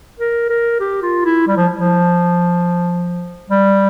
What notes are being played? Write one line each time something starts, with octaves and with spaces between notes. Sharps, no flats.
A#4
A#4
G4
F4
E4
G3
F3
F3
G3